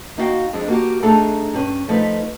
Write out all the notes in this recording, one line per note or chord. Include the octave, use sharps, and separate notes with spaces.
A#3 D#4 E4 F#4 F5 G5
F2 G#3 D4
A#3 F#4 G4
A3 D4 D#4 G#4 A4 A#5
G2 C#4
F3 A3 D#4 B4